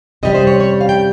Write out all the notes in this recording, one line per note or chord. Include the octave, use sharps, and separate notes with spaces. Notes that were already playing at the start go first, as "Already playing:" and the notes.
C3 G3 C#4 D#5
C5
C#5
C#5
F5
G5